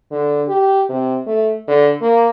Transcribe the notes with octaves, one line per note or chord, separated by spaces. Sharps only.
D3
G4
C3
A3
D3
A#3